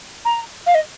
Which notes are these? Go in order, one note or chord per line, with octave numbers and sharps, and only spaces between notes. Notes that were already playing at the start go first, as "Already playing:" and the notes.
A#5
F5
D#5